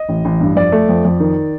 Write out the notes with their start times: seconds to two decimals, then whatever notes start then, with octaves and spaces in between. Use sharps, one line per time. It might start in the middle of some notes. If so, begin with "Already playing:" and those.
Already playing: D#5
0.09 A1
0.25 A1
0.40 G2
0.56 F2 D5
0.72 A3
0.89 F2
1.05 F2
1.20 D#3